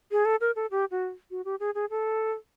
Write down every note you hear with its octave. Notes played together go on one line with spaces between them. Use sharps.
G#4
A4
A#4
A4
G4
F#4
F#4
G4
G#4
G#4
A4